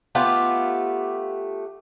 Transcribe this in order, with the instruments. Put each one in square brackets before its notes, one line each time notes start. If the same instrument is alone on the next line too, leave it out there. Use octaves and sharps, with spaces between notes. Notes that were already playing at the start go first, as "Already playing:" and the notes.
[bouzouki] A3 B3 F4 G4